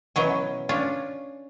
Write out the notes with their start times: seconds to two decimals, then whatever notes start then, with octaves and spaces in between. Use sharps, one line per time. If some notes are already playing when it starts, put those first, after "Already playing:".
0.16 B2 E3 F#3 C#4
0.69 C#4 D4 F4